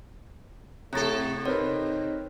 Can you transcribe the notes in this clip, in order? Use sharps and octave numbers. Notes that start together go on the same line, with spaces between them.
A2 C3 C4 A4 A#5 A6
C4 D#4 A#4 B4 C#5